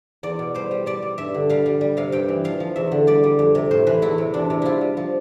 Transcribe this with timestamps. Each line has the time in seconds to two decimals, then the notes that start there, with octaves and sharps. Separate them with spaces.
0.23 E2 D5
0.39 B2
0.54 G3 C5
0.71 G3
0.86 G3 D5
1.02 G3
1.18 G2 E5
1.34 D3
1.49 G3 F5
1.66 G3
1.81 G3
1.97 C3 F5
2.12 G2 G5
2.28 E3
2.44 F3 F5
2.60 F3
2.76 E2 E5
2.92 D3
3.07 G3 D5
3.24 G3
3.39 F2
3.55 C3
3.71 A2 C5
3.87 E3 B4
4.02 E2 E4
4.18 C3
4.34 E2 D4
4.50 C3
4.62 G3 E4 F4
4.81 G3
4.97 F3